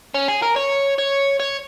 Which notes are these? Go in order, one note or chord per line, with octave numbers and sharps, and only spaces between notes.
C#4
G#4
A#4
C#5
C#5
C#5